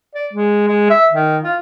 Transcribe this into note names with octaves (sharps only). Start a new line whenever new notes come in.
D5
G#3
G#3
E5
D#3
F4